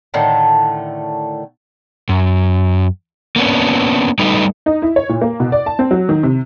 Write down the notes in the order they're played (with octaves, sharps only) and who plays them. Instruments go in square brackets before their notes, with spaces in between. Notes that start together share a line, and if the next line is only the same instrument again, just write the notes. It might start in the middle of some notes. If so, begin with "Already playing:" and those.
[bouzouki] A2 D3 D#3 A3
[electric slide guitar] F#2
A#3 B3 C#4 D4
G3 A3 D#4 B4
[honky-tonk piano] D#4
E4
C#5
A#2
A#3
B2
D5
A5
C4
F#3
D#3
C3